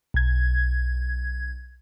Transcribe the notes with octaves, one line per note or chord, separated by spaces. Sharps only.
B1 G#6